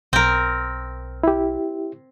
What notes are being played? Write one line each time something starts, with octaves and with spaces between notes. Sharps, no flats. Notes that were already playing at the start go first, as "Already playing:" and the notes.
B1 C4 A#4
E4 G4